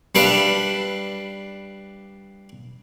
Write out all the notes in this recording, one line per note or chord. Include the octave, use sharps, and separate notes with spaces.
G3 D4 B4 E5 F5